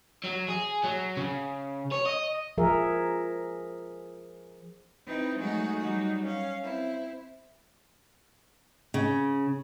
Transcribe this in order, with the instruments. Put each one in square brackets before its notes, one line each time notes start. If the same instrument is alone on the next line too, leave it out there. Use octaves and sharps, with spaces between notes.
[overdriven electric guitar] F#3
G#4
F#3
C#3
C#5
D#5
[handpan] F3 G#4 A#4 E5
[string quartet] C4 D#4 E4 B4
F#3 G#3 A3 D#4 F#4 G#4
F#3 G3 D#4 F#4
C#4 F5
C4 E4
[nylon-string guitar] C#3